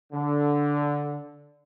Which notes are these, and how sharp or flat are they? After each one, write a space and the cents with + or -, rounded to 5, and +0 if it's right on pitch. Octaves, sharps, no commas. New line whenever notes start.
D3 -10